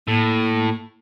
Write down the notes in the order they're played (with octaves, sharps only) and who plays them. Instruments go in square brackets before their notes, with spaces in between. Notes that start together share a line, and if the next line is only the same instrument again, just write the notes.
[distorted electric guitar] A2 [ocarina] A#3